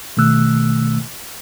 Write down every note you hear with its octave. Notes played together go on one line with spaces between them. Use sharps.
B2 D#3 A3 E6 F#6